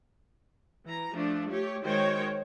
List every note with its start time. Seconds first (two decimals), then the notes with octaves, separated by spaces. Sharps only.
0.85 E3 A#5
1.14 F3 A3 D4
1.50 A3 G4 C#5
1.83 D#3 G#3 F#4 C5 C#5 G5